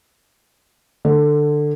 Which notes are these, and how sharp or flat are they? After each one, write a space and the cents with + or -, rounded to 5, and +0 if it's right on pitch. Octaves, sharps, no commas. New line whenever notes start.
D3 +15